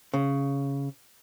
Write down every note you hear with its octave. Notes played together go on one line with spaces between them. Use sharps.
C#3